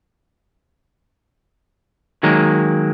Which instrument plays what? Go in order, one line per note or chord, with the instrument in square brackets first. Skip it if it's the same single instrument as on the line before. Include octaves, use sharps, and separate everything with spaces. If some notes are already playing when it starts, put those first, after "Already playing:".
[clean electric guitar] D#3 F#3 G#3 A#3